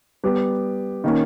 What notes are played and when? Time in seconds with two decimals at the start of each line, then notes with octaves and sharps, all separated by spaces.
0.24 G3 B3 G4
1.04 D#3 A#3 C#4